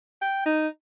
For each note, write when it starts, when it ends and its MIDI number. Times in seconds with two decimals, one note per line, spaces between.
0.21 0.41 79
0.46 0.68 63